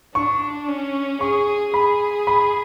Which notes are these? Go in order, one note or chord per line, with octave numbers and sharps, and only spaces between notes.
D4 C#6
C#4
G#4 C#6
G#4 B5
B5